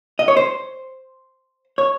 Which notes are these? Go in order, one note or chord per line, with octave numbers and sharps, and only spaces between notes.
D#5
C#5
C5
C#5